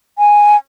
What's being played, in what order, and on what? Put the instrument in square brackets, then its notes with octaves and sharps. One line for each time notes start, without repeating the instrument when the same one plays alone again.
[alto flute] G#5